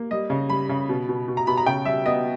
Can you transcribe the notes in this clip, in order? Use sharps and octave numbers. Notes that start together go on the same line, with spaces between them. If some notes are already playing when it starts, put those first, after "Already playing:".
Already playing: A#3
G3 D#5
C#3
G3 B5
C#3
B2
B2
B2
A#5
B2 B5
A#5
C#3 G5
G3 E5
B3 D#5